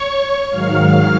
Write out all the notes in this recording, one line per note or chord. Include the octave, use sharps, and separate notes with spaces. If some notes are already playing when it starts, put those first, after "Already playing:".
Already playing: C#5 C#6
G#2 D#3 F#3 F5 F6